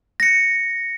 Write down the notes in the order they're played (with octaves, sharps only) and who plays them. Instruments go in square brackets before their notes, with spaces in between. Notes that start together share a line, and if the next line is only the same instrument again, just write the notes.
[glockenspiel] A#6 C#7